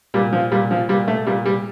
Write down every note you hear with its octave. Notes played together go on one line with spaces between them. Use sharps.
A#2 G3
F3
A#2 G3
F3
A#2 G3
A3
A#2 G3
G3